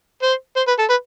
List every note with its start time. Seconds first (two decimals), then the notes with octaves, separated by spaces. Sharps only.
0.23 C5
0.57 C5
0.68 B4
0.79 A4
0.90 B4